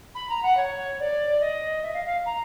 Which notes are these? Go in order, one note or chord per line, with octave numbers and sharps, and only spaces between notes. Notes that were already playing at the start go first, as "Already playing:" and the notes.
B5
A#5
F#5
C#5
D5
D#5
E5
F5
F5
A#5